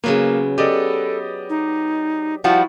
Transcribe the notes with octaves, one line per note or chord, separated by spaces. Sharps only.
C#3 F#3 A#3 B3
B3 G4 A4 D5 D#5
D#4
F3 G3 E4 F#4